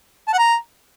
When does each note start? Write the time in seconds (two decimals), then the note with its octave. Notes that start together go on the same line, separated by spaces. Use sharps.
0.28 A5
0.33 F#5
0.38 A#5